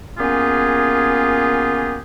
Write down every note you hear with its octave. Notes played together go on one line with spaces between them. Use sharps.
A#3 B3 C#4 F4 G4 G#4